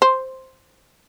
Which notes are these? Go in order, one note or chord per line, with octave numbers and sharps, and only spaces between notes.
C5